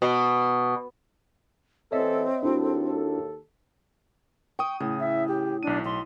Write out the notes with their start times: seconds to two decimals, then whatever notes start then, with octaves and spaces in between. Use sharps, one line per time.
0.02 B2
1.92 A1 E3 C4 A4 C#5 D#5 E5
2.43 D#2 D4 E4 F#4 A4
4.59 G5 C#6 D#6
4.80 A2 C#3
5.00 E5
5.28 G4
5.63 B1 D4 D#7
5.85 B1 C6